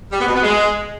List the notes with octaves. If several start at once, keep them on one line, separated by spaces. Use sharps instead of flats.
G3
B3
B2
B3
G#3